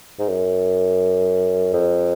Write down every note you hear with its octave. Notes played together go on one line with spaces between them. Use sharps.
G#2
F#2
F2